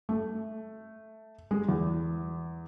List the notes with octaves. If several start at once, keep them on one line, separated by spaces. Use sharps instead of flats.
A3
G#3
E2